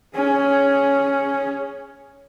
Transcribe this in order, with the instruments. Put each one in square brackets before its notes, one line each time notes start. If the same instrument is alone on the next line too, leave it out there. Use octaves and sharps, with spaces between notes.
[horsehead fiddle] C#4 G#4